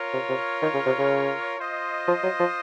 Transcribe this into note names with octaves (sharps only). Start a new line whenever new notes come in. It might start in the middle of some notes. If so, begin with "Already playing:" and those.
Already playing: F4 A#4 C#5
C3
C3
D#3
C#3
C3
C#3
F4 C5 D#5
F3
F#3
F3